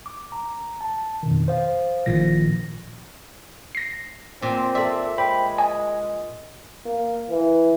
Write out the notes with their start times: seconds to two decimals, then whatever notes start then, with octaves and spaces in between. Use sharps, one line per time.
0.06 D6
0.32 A#5
0.81 A5
1.23 F2 B2 D#3
1.48 C5 F5
2.06 G#1 A#2 D#3 F3 A#6
3.75 A#6 C7
4.42 A#2 C4
4.75 A4 D5 E5
5.18 G#3 C5 G5 B5
5.58 D#5 G#5
6.85 A#3
7.30 E3